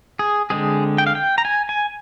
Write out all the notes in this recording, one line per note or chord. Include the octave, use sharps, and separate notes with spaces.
G#4
D3 G#3 C4 G#4
G5
F5
G5
A#5
G#5
G#5